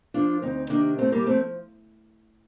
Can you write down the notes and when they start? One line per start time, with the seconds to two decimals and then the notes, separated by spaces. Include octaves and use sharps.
0.14 F3 D4 F4
0.42 D2 C4 D#4
0.70 C3 D#3 A#3 D4
0.98 A2 A3 C4
1.12 G3 A#3
1.26 F3 A3 C4